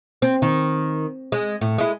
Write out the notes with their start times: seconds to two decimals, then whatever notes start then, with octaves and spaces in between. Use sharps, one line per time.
0.22 C4
0.42 D#3
1.32 G#3
1.61 A2
1.78 G#3 E4